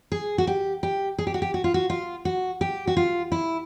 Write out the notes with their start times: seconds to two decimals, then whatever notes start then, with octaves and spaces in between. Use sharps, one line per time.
0.12 G#4
0.38 F#4
0.47 G4
0.83 G4
1.19 G#4
1.27 G4
1.34 F#4
1.42 G4
1.54 F#4
1.64 F4
1.74 F#4
1.90 F4
2.25 F#4
2.61 G4
2.87 F#4
2.97 F4
3.32 E4